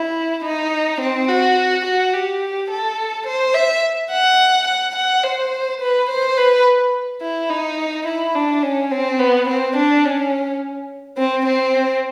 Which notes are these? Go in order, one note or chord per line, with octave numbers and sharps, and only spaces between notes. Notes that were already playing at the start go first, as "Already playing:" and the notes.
Already playing: E4
D#4
C4
F#4
F#4
G4
A4
C5
E5
F#5
F#5
F#5
C5
B4
C5
B4
E4
D#4
E4
D4
C#4
C4
B3
C4
D4
C#4
C4
C4